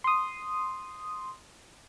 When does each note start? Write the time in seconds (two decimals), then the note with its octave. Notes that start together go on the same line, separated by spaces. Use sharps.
0.04 C6 D#6